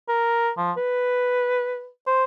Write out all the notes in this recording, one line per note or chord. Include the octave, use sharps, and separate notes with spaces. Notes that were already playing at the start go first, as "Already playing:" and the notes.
A#4
F3
B4
C5